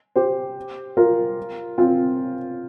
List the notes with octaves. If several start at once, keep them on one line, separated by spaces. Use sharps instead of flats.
G4 C5
F4 A#4
C4 F4